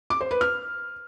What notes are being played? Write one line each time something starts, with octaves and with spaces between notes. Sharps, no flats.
D6
C5
B4
F6